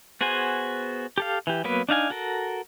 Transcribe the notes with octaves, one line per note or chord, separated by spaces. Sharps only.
B3 F#4 G#4 C5 G#5
G4 A4 F5
E3 G4
F#3 A#3 B3 B4
D4 D#4 F5 G#5
F#4 A4 A#4